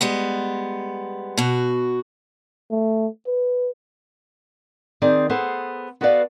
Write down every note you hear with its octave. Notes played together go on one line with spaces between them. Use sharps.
G3 G#3 B3
B2 F#4
A3
B4
D#3 C4 G#4 D5
B3 G#4 A4 C5
B3 F#4 A4 B4 D5 F5